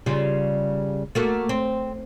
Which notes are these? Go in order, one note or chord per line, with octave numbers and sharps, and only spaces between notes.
C#3 G3 F4
A3 A#3 F#4
C4